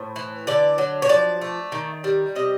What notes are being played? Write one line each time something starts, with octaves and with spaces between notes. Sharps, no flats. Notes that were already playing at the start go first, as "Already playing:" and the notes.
Already playing: A2 C5
E3
D3 D5
F#3
C#5
F3 D5
A3
D#3
G3
C3 D#5